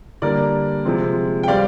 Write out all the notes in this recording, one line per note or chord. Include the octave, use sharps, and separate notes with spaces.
D3 G3 A#3 A#4 D5
C3 F3 G#3 C4
G5
G3 C4 D5 F5